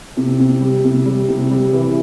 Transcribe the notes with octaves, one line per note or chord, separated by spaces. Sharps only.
C3
C3
G3
C3
G3
C3
G3
E3